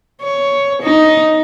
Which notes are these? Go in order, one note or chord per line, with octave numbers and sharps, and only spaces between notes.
C#5
D#4